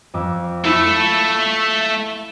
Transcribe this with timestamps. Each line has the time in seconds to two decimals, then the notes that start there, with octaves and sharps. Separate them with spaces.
0.14 F2 D6 E6
0.65 A3 E4 F4 A4 E6